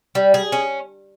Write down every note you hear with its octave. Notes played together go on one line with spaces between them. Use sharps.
G3
G#4
C#4